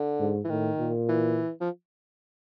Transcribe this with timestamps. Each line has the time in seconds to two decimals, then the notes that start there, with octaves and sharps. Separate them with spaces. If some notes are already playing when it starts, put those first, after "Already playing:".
Already playing: D3
0.19 G#2
0.44 E3
0.49 A2 D#3
0.79 A#2
1.09 E3
1.61 F3